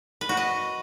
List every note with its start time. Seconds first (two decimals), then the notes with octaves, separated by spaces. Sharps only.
0.21 B4
0.29 F#4
0.37 D#5